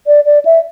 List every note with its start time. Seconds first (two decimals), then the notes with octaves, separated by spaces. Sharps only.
0.07 D5
0.25 D5
0.45 E5